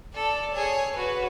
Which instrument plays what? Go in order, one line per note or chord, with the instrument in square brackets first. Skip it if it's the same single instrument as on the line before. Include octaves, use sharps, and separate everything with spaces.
[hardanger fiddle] A4 [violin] D5
[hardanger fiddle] G#4 [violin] C#5
[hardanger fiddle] F#4 [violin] B4